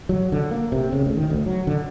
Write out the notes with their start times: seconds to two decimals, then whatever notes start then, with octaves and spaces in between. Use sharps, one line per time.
0.09 F#3
0.32 D3
0.51 A#3
0.72 C3
0.92 C#3
1.06 D2
1.17 D#3
1.30 D2
1.46 F#3
1.67 D3